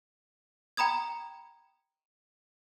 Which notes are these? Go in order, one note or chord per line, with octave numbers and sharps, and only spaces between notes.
G5 A#5 B5 D#6 G#6